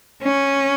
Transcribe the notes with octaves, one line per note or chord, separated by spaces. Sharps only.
C#4